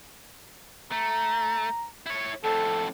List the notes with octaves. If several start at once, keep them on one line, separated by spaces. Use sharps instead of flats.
A3 A#5
E4 C#5
F2 A2 A4